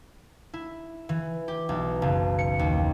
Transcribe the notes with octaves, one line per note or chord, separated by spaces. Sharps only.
E4
E3
G4
B1
F#1
C#7
D#2